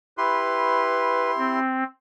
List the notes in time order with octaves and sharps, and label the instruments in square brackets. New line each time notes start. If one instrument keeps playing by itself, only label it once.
[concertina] E4 G4 C6 [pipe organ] B4
[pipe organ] C4